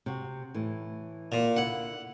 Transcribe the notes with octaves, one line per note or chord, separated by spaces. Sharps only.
C3 F#4
A2 E3
A#2
D3 E4 F#5